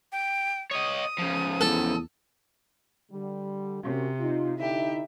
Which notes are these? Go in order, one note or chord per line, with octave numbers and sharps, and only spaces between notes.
G5
C#5 D#5 D#6
C#3 F3
E2 A4
D3 G3
C3 A#3 C#4 F#4
D#4 F4
D3 D#4 E4 G4 E5